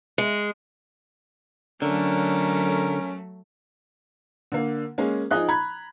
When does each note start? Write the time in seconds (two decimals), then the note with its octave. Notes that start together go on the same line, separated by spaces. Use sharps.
0.18 G#3
1.82 D3 F#3 A3 C#4 A#4
4.52 D3 A#3
4.98 G#3 A#3 C#4
5.31 F3 D#4 G#4 D#5 F#6
5.48 A#5 B5 G#6